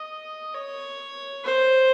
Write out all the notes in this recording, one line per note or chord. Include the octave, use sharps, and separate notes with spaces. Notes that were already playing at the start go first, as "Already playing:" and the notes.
Already playing: D#5
C#5
C5